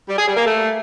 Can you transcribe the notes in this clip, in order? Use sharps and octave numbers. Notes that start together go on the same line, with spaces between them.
G3
G#4
G3
A#3
A3